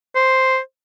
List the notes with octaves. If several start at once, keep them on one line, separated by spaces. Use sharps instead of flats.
C5